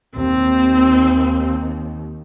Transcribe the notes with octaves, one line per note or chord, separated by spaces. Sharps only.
D#2 C4